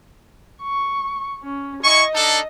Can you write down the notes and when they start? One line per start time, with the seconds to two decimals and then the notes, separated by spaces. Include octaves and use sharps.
0.62 C#6
1.43 C#4
1.83 E4 D#5 G#5 C#6
2.14 D4 D#4 A4